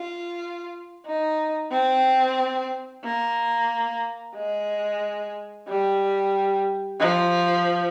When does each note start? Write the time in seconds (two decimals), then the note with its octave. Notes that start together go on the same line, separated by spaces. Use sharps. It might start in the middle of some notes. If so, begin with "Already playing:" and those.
Already playing: F4
1.06 D#4
1.72 C4
3.04 A#3
4.36 G#3
5.68 G3
7.00 F3